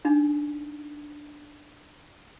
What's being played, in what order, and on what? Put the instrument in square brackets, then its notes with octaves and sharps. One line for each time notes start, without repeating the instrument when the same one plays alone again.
[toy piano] D4 D#4